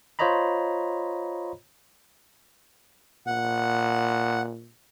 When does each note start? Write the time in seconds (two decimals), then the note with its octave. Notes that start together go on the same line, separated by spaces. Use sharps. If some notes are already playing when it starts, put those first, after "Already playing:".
0.19 F4 C5 C#5 D#5 A#5 B5
3.27 A#2 F#5